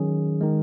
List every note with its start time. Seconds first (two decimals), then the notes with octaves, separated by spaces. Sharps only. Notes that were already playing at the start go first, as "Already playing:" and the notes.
Already playing: D#3 F#3 C#4 G#4
0.41 D#3 G#3